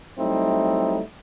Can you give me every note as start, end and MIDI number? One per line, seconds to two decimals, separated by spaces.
0.18 1.01 54
0.18 1.01 55
0.18 1.01 57
0.18 1.01 60
0.18 1.01 63
0.18 1.01 64